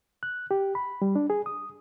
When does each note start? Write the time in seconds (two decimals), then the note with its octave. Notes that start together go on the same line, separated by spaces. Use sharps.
0.23 F#6
0.51 G4
0.75 B5
1.02 G3
1.16 D4
1.30 G#4
1.46 D#6